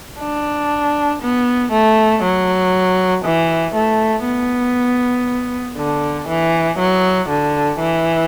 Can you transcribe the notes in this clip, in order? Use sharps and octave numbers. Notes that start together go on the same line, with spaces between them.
D4
B3
A3
F#3
E3
A3
B3
D3
E3
F#3
D3
E3